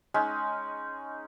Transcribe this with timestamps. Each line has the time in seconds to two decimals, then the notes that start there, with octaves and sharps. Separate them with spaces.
0.14 G#3 C#4 D#4